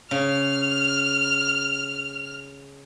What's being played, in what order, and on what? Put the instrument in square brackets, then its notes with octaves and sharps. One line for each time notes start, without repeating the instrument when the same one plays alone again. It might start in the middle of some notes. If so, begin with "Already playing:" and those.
[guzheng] C#3 [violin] F6